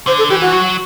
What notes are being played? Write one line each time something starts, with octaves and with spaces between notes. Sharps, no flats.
D3 C5
A4
E3 G4
F#4
F#3